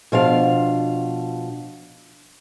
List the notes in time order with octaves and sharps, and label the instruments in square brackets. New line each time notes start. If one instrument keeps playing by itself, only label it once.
[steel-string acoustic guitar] B2 F3 D4 F5